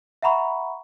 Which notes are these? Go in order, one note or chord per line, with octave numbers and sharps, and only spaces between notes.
E5 F#5 A#5 B5 C#6